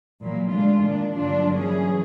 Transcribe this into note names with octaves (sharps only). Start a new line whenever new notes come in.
A#2 E3 F#3 A#3
D3 G#3 A3 D4 F4
A#2 D#3 D4
G2 D3 F#3 A#3 D4 F4
E3 F#3 C#4 G#4